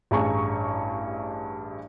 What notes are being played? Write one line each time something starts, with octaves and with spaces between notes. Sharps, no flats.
A1 G2 G#4 A#5 C#6